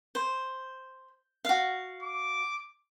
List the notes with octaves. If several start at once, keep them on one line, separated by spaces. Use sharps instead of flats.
C5
F#4 F5
D6